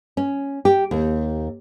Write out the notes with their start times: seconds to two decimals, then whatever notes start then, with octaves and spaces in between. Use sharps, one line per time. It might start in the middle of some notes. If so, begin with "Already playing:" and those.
0.17 C#4
0.65 G4
0.91 D#2